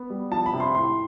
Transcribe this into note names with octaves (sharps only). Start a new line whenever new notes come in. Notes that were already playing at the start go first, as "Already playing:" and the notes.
Already playing: B3
G3
F3 A5
B5
C3
C6
A2 C6